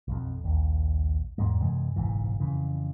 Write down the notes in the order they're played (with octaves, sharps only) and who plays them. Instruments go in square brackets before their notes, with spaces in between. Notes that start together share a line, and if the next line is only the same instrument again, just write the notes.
[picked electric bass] B1 F2
A#1 D#2
E2 G#2 G#3
F#2 C3 E3 G#3
F#1 B1 G#2 E3
F2 C#3 E3